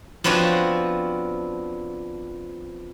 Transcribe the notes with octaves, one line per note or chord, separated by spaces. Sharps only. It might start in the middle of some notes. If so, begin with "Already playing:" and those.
F3 B3 C4 D4 F#4 C#5